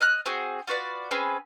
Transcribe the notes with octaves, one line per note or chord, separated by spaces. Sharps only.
D#5 F6 F#6
C4 F#4 G#4
F4 F#4 B4 D5
C4 C#4 G#4 B4